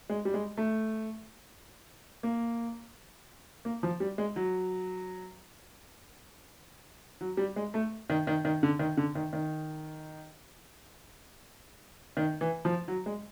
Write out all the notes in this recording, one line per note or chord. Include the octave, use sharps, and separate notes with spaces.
G#3
G3
G#3
A3
A#3
A#3
F3
G3
G#3
F#3
F#3
G3
G#3
A3
D#3
D#3
D#3
D3
D#3
D3
D#3
D#3
D#3
E3
F3
F#3
G#3